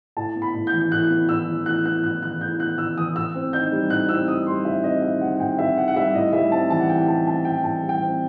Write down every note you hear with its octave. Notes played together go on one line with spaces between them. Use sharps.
A2 A5
B3
B5
A2
G6
E3
A2 F#6
B3
A2 E6
E3
A2 F#6
B3 F#6
A2 F#6
E3 F#6
A2 G6
B3 F#6
A2 E6
E3 D#6
A2 E6
C4
D#4 G6
G3
A2 F#6
C4 E6
D#4 D#6
G3 C6
A2 E5
C4 D#5
D#4 E5
G3 F#5
F#5
A2 G5
C4 E5
D#4 F#5
F#5
G3 E5
A2 D#5
G3 E5
C4 A5
E3 A5
F#5
A2 G5
G3 A5
C4 A5
E3 G5
A2 A5
G3
G5
C4